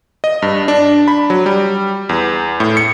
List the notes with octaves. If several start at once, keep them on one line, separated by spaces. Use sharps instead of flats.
D#5
G2
D4
B5
F#3
G3
E2
A2
C#7